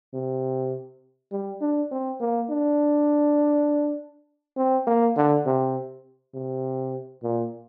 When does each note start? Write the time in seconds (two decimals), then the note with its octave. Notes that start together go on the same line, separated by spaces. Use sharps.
0.14 C3
1.32 G3
1.62 D4
1.91 C4
2.21 A#3
2.50 D4
4.57 C4
4.87 A#3
5.17 D3
5.46 C3
6.35 C3
7.23 A#2